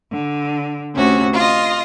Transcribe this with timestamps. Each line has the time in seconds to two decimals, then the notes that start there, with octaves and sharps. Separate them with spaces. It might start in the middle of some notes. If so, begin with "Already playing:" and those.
0.11 D3
0.93 D2 C3 C#4 F#4
1.33 F4 D#5